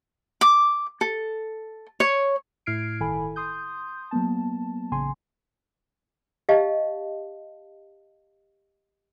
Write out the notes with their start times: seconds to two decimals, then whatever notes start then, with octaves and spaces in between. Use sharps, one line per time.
0.41 D6
1.01 A4
2.00 C#5
2.66 A2 E4 F6 G#6 C7 D7
3.00 G1 D#3 E4 A4 G#5 B5
3.36 C6 D#6 G6
4.11 F#3 A#3 B3 A5
4.92 A1 C#3 G#5 C6
6.49 G4 D#5 F5 A5